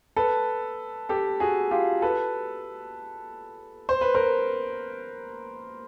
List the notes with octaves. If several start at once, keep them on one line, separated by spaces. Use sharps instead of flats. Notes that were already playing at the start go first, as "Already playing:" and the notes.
A4 B4
G4 A4
F#4 G#4
F4 G4
A4 B4
C5
B4
A#4 C5